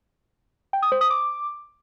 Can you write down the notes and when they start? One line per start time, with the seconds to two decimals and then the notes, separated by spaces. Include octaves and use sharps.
0.73 G5
0.82 D#6
0.92 C5
1.01 D#6
1.10 D6